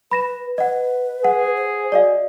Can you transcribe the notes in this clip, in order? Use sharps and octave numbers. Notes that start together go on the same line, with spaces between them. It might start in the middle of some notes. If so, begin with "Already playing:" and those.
B4 B5 A#6 E7
B4 D#5 F#5
G#4 F#5
C5
F#4 D5 D#5 F5